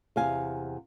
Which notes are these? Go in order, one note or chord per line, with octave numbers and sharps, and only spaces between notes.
E2 C3 F5 G#5